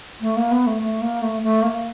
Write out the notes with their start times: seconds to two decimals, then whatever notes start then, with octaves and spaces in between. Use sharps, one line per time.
0.21 A3
0.37 A#3
0.52 B3
0.67 A3
0.82 A3
1.02 A#3
1.22 A3
1.42 A3
1.63 A#3